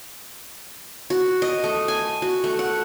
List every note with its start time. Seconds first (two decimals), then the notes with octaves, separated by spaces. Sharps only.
1.10 F#4
1.42 D#5
1.64 A3
1.88 G#5
2.22 F#4
2.44 A3
2.59 F#5